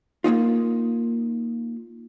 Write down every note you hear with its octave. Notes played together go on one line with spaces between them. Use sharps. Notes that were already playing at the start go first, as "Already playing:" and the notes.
A#3 C#4 D#4 F4